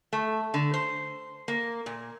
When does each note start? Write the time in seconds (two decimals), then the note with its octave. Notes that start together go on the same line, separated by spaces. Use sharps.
0.13 A3
0.54 D3
0.74 C5
1.48 A#3
1.86 A#2